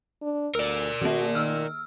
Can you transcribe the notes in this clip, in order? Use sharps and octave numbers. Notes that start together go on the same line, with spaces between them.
D4
D2 A#4 D5 E6
D#3 A#3 F#4
D#3 E6 F6